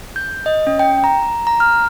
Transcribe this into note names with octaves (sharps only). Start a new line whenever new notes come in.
G6
D#5
C#4
G5
A#5
A#5
F6